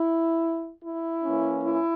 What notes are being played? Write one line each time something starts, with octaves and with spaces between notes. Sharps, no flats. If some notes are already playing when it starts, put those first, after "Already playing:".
Already playing: E4
E4
E3 A#3 C#4
E4